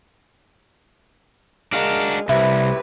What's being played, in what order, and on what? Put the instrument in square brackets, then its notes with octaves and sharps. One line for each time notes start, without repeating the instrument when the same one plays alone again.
[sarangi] G#3 [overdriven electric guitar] D4 F#4 [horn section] A#4 F5
[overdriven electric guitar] C2 [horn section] F#2 A2 C3 [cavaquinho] E4 [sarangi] B4